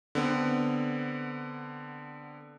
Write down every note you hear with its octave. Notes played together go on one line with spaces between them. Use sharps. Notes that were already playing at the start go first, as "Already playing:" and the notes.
D3 B3 C4